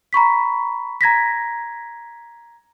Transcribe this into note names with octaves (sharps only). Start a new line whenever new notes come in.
A#5 B5 C#6 B6
A#5 G#6 A#6 B6